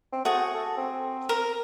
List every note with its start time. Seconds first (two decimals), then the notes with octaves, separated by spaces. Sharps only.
0.13 C4
0.25 A3 F#4 G#4
0.54 A4
0.77 C4
1.29 A#4